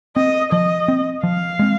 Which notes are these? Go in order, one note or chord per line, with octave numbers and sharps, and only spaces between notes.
C4 D#5
F3 D#5
C4
F3 F5
G#3 C4